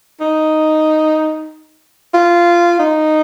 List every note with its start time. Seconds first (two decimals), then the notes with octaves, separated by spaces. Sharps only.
0.21 D#4
2.14 F4
2.79 D#4